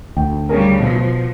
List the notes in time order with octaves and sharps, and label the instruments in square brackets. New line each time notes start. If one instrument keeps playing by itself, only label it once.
[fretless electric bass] D2 [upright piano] G5
[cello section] C#3 G3 [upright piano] C#4 G#4 A#4
[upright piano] B2 [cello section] F3